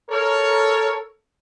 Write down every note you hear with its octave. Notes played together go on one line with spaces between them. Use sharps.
A4 A#4 C#5